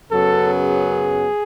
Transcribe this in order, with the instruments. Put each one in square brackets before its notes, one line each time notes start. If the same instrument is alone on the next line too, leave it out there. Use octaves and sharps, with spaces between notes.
[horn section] F#2 C#3 F#3 B3 A4
G#4